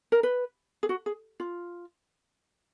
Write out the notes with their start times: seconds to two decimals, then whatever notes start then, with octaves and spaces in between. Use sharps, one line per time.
0.12 A#4
0.23 B4
0.83 G#4
0.89 F#4
1.06 G#4
1.40 F4